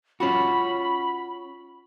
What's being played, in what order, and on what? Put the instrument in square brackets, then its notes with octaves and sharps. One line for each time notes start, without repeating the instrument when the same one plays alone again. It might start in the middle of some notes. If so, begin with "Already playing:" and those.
[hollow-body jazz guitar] C#4 F4 F#4 [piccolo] B5